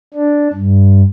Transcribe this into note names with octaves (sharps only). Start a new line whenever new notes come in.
D4
G2